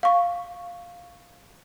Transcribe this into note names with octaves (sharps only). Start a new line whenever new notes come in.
F5 C#6